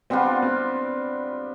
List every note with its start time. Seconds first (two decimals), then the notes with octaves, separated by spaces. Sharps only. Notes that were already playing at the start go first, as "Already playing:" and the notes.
0.10 G3 B3 C4 D4 F4
0.42 C4